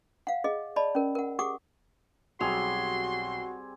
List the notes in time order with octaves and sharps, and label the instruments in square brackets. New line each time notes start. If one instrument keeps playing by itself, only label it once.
[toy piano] F5 F#5
G#4 D#5
D5 D#5 A5 B5
C#4 A#4
A#4 F#5
G4 G#4 F#5 D6 D#6
[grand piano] B1 F7 [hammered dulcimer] G3 C4 G#4 [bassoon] F#4 [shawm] C6